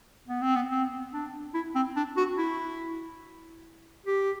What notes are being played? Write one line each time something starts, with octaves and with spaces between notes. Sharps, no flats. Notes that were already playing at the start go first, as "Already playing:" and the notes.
B3
C4
B3
C4
D4
E4
C4
D4
F#4
E4
G4